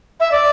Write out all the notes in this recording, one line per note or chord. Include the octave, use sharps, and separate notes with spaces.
E5
D5